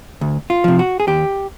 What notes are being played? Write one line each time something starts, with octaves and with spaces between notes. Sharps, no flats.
D2
F4
C3 F3
F#4
G#4
D#2 G4